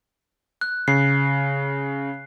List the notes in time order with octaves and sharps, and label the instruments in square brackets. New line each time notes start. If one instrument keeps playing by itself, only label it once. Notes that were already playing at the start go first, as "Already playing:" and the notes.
[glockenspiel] F#6
[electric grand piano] C#3 [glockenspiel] C7